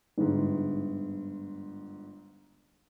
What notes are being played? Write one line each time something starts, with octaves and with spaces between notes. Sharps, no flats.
G1 G#2